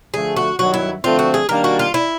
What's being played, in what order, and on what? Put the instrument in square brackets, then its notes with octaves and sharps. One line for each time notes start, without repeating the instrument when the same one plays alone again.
[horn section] D3 F3 A3 [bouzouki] G#4
[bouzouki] F#4
[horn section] G2 D#3 F#3 [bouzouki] F#4
[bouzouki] E4
[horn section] D3 F3 A3 C4 [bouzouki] F4
[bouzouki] F#4
G#4
[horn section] D#3 G3 A#3 D4 [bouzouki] A#4
[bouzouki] F#4
F4
E4